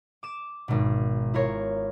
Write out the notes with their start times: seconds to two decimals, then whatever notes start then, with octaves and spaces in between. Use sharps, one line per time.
0.23 D6 E7
0.68 G#1 B2
1.34 E4 F4 A#4 C#5